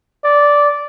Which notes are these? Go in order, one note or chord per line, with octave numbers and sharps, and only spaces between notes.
D5